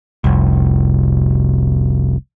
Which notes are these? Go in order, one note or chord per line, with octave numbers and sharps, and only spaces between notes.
F1 C2